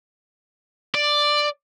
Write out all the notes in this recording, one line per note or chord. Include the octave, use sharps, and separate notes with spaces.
D5